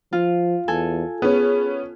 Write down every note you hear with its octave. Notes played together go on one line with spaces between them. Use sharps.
F3 F4
E2 A4 G#5
B3 C#4 G#4